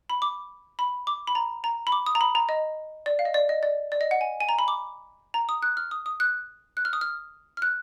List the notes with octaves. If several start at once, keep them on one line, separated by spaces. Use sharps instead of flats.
B5
D6
B5
D6
B5
A#5
A#5
B5
D6
D#6
A#5
B5
A#5
D#5
D5
F5
D#5
D5
D#5
D5
D5
D#5
F#5
G#5
G#5
A#5
B5
D6
A#5
D#6
F#6
F6
D#6
D#6
F#6
F#6
F6
D#6
F6
F6
F#6